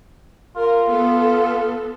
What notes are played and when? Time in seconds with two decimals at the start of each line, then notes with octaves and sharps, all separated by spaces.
0.56 F4 A#4
0.87 B3 A4